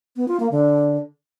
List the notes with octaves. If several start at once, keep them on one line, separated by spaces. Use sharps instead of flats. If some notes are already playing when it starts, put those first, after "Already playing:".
B3
F4
A#3
D3